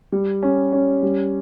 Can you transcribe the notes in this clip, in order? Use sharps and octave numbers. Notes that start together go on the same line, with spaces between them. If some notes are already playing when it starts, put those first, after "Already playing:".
G3
C#4
C#4
G3